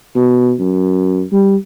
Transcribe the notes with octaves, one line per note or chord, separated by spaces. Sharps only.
B2
F#2
G3